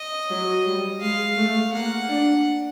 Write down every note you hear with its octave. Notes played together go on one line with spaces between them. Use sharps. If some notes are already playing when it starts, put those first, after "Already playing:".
Already playing: D#5
F#3
G3
G#3 F5
A3
A#3 F#5
D4